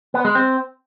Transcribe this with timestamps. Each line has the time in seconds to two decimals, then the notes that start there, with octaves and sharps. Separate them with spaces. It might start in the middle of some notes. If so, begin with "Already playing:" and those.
0.14 B3
0.25 G#3
0.35 C4